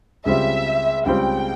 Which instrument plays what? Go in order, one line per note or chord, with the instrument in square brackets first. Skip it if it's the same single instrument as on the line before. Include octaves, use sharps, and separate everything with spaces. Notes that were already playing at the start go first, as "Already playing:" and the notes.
[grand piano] C#2 C#3 G3 C4 F4 [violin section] E5
[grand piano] C#2 C#3 G3 C4 F4 [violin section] G5